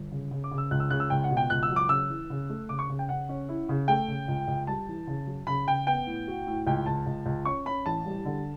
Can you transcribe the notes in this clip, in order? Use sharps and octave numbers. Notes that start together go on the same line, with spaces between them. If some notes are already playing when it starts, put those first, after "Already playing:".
Already playing: G1
C#3
C#3
D6
C#3
E6
C#2 F#6
E6
C#3 F#6
E6
C#2 G5
F#5
B2
G5
C#2 F#6
E6
F#3
D6
C#3 E6
E3
C#3
A3
C#3 D6
C#6
C#3
G5
C#3 F#5
C#4
E4
C#3
A3 G5
C#3
C#2
C#2
G3 A5
E3
C#3
F#3
C#3 B5
C#3 G5
B3 G5
A2
F#4
A2
C#2 G5
C#2 A5
C#2
C#2
C#4 C#6
C#4 B5
A1 A5
G3
D3